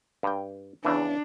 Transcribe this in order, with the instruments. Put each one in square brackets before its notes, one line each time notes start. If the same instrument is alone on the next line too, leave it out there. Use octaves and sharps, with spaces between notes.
[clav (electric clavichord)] G2 G5
[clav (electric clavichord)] E2 C#3 E3 [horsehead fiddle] D4